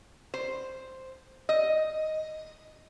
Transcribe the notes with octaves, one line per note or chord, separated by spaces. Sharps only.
C5
D#5